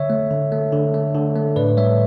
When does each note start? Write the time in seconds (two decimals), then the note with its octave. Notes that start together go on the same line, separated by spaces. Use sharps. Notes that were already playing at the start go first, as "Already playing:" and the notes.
Already playing: D3 C#5 E5
0.10 A3
0.31 D3
0.52 A3
0.72 D3
0.94 A3
1.14 D3
1.36 A3
1.56 A2 B4 D5
1.77 G3 C#5 E5